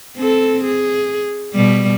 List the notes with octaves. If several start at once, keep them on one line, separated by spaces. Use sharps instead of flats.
C4 A4
G#4
B2 G3